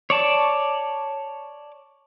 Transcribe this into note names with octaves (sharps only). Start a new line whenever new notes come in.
C#5 D5 A5